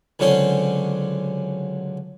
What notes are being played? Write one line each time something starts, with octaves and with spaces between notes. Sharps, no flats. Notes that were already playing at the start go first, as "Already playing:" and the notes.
C#2 D3 F#3 C4 C#4 C6